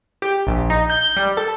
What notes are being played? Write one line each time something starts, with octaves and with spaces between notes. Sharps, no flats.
G4
A#1
D#4
G6
G3
A4